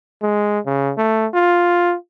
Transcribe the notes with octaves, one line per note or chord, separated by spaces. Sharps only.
G#3
C#3
A3
F4